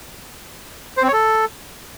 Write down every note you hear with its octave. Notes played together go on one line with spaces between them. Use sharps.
C5
C4
C#5
A4